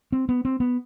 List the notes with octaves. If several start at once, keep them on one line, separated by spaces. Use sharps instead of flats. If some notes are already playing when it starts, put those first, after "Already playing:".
C4
B3
C4
B3